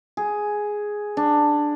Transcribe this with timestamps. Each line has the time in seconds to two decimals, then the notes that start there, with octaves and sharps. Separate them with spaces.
0.17 G#4
1.17 D4